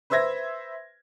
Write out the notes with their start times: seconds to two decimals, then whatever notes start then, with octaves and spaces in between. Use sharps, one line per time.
0.10 B4 C5 E5 E6 G#6 A#6